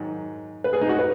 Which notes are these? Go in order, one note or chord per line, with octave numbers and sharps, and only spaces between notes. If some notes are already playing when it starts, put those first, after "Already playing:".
Already playing: G#2 D#3 F#3
B4
G#4
D#4
F#4
B4